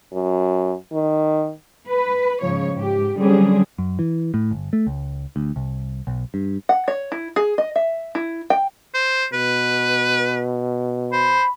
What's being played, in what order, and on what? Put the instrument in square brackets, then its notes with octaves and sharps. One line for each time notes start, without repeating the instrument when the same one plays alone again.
[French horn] F#2
D#3
[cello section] B4
G#2 C#3 F3 C#5
G#2 G4
D3 F#3 G3 C4 C#4 G#4
[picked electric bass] F#2
E3
A2
G1
A3
C#2
D2
C2
B1
G2
[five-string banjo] F#5
C#5
E4
G#4
D#5
E5
E4
G5
[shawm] C5
[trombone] B2 [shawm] B4
[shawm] C5 [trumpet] B5